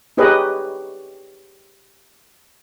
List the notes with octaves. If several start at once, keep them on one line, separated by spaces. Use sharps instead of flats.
D#4 G4 G#4 B4 C#5 D#5